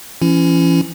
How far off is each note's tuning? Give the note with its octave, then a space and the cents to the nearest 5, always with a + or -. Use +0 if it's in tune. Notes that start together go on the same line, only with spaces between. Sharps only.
E3 +40 C#4 +0 E4 +35